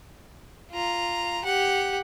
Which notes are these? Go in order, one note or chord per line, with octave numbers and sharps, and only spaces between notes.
F4 A#5
G4 F#5